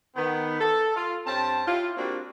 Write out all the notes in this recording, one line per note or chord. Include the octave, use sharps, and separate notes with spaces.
D#3 B3
A4
F4
G2 C4 C#4 A5
E4 F4 G4
G3 A#3 C4 D4 F4 F#4